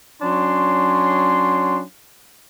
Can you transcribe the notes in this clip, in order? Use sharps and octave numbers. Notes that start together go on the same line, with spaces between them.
F#3 C#4 D4 C6